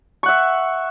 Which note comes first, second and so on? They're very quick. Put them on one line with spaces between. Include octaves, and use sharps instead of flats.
C#6 F#5 E5